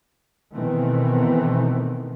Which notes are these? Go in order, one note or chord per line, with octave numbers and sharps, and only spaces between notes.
B2 D#3 E3 A3 B3 C4